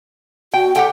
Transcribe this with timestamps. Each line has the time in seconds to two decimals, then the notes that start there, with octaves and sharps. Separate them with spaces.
0.54 F#4 G5
0.76 G4 A4 F#5 G5